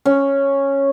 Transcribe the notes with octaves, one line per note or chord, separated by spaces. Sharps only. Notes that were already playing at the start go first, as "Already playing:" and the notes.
C#4